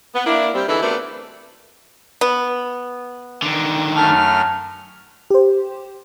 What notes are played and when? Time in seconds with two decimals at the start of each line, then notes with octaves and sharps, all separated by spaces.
0.14 B3
0.26 A#3 D4 E4
0.54 G3 C4
0.68 D3 E3 D#4 E4 G#4 A4
0.82 A3 B3 C4 D4 F#4 A#4
2.21 B3
3.42 D3 D#3
3.96 F#2 A3 A5 F6
5.30 G4 C5